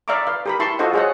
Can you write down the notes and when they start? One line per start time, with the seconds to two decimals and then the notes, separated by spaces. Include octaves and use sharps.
0.08 D5 E5 F5 A#5 C#6 D6
0.27 B4 F5
0.46 G4 A#4 B5
0.60 E4 A5 C6 C#6
0.79 F4 F#4 A4 C5 D#5 F#5
0.93 G#4 C5 C#5 D#5 F#5